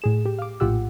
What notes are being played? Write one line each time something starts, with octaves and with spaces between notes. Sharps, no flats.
A2 G#4 E7
G4
F5 D6
A#1 A2 F4 G4 F#5 E6